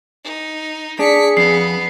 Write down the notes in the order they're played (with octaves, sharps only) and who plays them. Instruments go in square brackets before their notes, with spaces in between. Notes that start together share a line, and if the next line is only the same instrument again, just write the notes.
[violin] D#4
[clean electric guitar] D4 [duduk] G#4 [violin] B6 C#7
[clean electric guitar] F2 [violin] B3 [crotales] C7